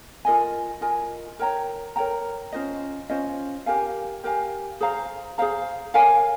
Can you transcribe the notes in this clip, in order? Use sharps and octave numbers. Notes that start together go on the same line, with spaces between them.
F4 A#4 D#5 G#5
F4 A#4 D#5 G#5
A#4 C#5 G5 A#5
A#4 C#5 G5 A#5
C#4 F4 C5 D#5
C#4 F4 C5 D#5
G4 A#4 F5 G#5
G4 A#4 F5 G#5
G#4 C5 F5 A#5
G#4 C5 F5 A#5
A#4 C#5 F5 G#5